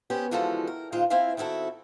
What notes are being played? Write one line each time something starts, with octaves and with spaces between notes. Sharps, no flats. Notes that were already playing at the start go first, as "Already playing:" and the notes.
B3 C#4 G4 C5
D3 E3 F3 G#3 F#4 A4
A#4
A#2 D#3 G#3 F4 C5 F5
C4 E4 C5 F5 G#5
D#3 C4 E4 F#4 A4